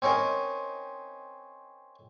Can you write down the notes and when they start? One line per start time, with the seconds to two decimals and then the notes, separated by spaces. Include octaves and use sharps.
0.02 C4 C#4 D#4 A#4